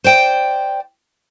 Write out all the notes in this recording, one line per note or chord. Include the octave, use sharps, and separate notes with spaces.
C5 D5 G5